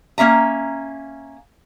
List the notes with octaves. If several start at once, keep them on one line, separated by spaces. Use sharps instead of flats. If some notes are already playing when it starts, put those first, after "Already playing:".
A#3 C#4 E5 A#5